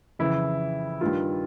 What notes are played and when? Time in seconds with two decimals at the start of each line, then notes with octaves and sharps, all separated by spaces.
0.19 F2 C#3 E3 E4
1.01 G2 D#3 G3 F4